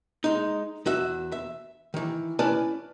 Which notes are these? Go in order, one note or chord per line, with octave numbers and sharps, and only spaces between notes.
G#3 D#4
E2 F#4 E5
E5
D#3 E3
C#4 E4 B4 D5 G#5 A5